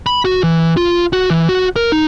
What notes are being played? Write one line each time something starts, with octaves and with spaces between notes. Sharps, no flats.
B5
F#4
E3
F4
F#4
E3
F#4
A#4
D#4